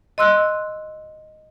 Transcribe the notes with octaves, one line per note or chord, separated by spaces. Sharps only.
D#5 C6 E6 F#6